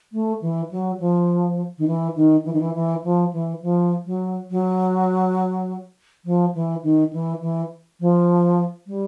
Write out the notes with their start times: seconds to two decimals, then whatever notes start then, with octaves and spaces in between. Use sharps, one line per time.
0.12 A3
0.42 E3
0.71 F#3
1.00 F3
1.78 D#3
1.88 E3
2.16 D#3
2.45 E3
2.53 D#3
2.61 E3
2.75 E3
3.04 F3
3.33 E3
3.62 F3
4.06 F#3
4.51 F#3
6.25 F3
6.55 E3
6.84 D#3
7.13 E3
7.41 E3
8.00 F3
8.87 G3